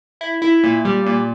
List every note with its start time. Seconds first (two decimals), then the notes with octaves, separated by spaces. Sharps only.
0.21 E4
0.42 E4
0.64 A#2
0.85 G3
1.06 A#2